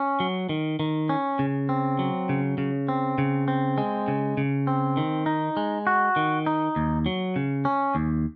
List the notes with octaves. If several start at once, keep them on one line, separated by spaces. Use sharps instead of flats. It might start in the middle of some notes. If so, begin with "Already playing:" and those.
Already playing: C#4
F#3
D#3
D#3
C#4
C#3
C4
F#3
C#3
C#3
C4
C#3
C4
G#3
C#3
C#3
C4
D#3
D#4
G#3
F#4
D#3
D#4
D#2
F#3
C#3
C#4
D#2